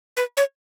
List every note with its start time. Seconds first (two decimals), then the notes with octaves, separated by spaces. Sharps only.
0.17 B4
0.37 C#5